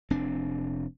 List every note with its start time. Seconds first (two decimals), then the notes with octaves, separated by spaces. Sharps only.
0.10 F1 C4 D4